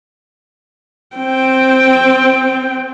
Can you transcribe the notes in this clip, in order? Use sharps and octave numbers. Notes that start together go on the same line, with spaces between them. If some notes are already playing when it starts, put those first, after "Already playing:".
C4 G5